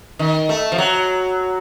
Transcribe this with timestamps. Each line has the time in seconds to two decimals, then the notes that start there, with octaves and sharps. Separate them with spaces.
0.19 D#3
0.49 A3
0.72 F3
0.78 F#3